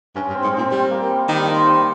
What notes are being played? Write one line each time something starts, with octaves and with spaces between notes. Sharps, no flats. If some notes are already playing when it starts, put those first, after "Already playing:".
G2 C#4
G2
C4
G#2
C4
A#2
G3
A#3
G3
D#3 G3
F3
G3